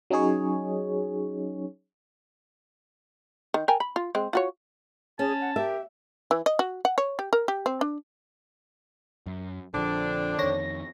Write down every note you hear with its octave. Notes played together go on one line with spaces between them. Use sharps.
F#3 C#4 D#4 G#4 C#5
D#3
A#4 G5 G#5
B5
F4
G#3 C4
F4 F#4 C#5
C#4 G#4 A5
F#5
G4 A#4 E5
E3
D#5
F#4
F#5
C#5
G4
A#4
G4
C4
D4
F#2
A#1 D3 F3 C4 D4
F2 D#3 C#5 A#6